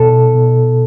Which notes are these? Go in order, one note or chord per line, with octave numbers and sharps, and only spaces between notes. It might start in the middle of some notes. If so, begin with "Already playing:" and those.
Already playing: B2 A4
B2